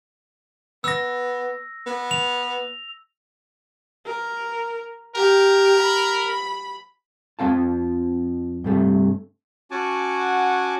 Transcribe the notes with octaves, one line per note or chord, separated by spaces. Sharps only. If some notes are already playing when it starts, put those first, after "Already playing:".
B3 E6 A#6
B3
F7
A#4
G4 A#4
B5
F2 F3 G#3 C4 F5 A5
G2 C3 A3
C#4 F#4 F#5 G#5 A5 D6